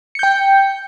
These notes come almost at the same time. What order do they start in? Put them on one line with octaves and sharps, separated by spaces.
C#7 G6 G5